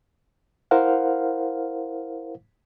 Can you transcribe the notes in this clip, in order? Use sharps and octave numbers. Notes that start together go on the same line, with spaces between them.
E4 A#4 C5 F5 F#5